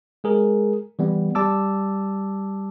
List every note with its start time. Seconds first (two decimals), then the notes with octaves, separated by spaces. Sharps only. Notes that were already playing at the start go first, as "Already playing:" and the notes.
0.24 G#3 G#4 A#4
0.99 E3 G3 B3
1.35 G3 A5 D6 E6